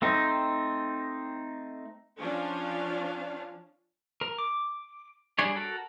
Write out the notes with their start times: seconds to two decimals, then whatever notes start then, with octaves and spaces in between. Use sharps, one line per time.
0.02 A3 C4 D#4
2.18 F3 C#4 D4 F5
4.21 A#4
4.38 D6
5.39 G3 D4 G#4 C#5
5.56 F#4 A4 A#4